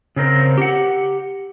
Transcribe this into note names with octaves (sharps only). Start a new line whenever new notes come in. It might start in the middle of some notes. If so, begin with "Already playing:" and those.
C#3 C4 A#4 C5
G4 F#5